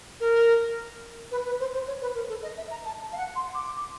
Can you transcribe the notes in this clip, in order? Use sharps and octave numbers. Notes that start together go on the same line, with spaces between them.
A#4
B4
B4
C5
C5
C#5
B4
A#4
A4
D#5
E5
A#5
A5
F5
F#5
C6
D6